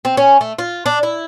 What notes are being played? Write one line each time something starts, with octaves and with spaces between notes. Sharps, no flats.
C4
C#4
A3
F4
D4
E4